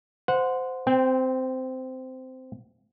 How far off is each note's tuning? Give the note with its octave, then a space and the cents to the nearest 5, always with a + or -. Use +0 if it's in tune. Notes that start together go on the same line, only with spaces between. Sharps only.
C5 -15 F#5 -20
C4 -15 G5 +20